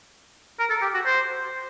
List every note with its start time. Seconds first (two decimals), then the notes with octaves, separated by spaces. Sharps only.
0.59 A#4
0.70 A4
0.82 G4
0.94 F#4
1.06 C5